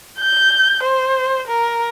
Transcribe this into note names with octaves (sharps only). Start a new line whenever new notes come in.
G6
C5
A#4